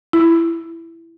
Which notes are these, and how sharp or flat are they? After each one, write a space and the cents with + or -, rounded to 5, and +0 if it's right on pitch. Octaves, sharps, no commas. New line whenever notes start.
E4 +10